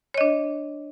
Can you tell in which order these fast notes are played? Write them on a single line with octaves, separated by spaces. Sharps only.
C#5 D#5 D4